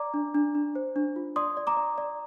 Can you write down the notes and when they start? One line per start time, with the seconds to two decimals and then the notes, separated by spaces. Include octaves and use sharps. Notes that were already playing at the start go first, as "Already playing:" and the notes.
Already playing: D5 A#5 D6
0.14 D4
0.35 D4
0.55 D4
0.75 C5
0.96 D4
1.16 F4
1.36 D5 C6 D#6
1.57 D5
1.67 A#5 D6
1.77 D5
1.98 D5